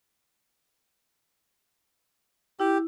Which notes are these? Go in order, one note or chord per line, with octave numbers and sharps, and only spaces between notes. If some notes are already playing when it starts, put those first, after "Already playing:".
E4 G4